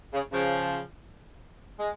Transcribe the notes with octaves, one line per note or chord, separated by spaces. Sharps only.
C#3
C#3 F3
G#3